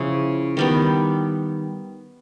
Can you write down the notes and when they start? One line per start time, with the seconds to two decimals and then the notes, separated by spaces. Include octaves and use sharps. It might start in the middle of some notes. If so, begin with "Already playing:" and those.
Already playing: C#3 F3 E4
0.57 D#3 G3 B3